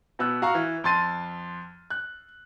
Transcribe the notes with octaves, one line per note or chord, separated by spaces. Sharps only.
B2 B3 E6 F#6
F#4 F5 A#5 C#6 F6
E3
F2 A5 C6 A6 D#7
F#6